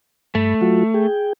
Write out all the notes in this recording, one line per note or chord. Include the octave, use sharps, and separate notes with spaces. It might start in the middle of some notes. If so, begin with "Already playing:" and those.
G2 A3 B5
F#3 F4 F#4
G#4 G5